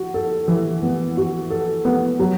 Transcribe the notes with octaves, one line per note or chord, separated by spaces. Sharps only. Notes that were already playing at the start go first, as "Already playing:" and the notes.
Already playing: F#4
A4
E3
B3
F#4
A4
B3
F#3